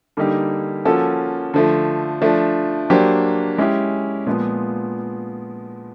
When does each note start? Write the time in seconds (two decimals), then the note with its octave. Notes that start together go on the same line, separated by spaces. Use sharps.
0.17 D3 G3 A#3 D#4 G4
0.85 F3 A#3 C#4 F#4 A4
1.54 D3 F3 A3
2.22 F3 A3 D4
2.90 F#3 A#3 D4 G4 C5
3.58 G#3 C#4 E4 G4
4.26 A#2 F3 G#3 B3